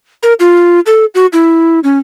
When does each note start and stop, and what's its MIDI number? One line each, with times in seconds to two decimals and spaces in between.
0.23 0.33 70
0.40 0.80 65
0.86 1.05 69
1.15 1.26 66
1.33 1.80 64
1.84 1.99 61